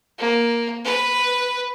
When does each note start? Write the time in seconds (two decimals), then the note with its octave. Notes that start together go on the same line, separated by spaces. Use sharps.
0.18 A#3
0.84 B4